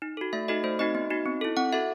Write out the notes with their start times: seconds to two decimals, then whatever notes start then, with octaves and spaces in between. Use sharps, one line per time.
0.02 D#4
0.17 F#4 A4
0.33 A3 E5
0.48 D#4 F#4 A4 D#5
0.64 A3 C5
0.79 C4 D#4 F#4 D#5
0.95 B3
1.10 D#4 F#4
1.26 C4
1.41 E4 A4
1.57 C4 F#5
1.72 F#4 A4 E5